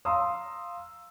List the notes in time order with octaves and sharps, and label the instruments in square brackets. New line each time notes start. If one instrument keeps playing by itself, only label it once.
[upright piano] F5 A#5 C6 D#6 E6